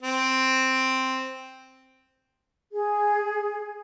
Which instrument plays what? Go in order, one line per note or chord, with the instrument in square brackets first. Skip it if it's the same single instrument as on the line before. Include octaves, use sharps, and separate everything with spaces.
[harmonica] C4
[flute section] G#4